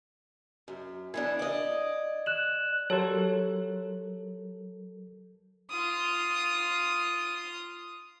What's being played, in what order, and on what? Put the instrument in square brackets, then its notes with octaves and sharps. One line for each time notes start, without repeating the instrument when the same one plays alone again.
[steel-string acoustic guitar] F#2
[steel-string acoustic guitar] E3 B3 D4 [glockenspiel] G#6
[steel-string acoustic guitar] D5 D#5
[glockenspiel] F#6 E7 F#7
[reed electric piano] F#3 A4 A#4 [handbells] G4 C#5
[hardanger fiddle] F4 D#6